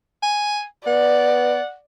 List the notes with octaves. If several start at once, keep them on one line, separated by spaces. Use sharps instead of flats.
G#5
B3 D5 F#5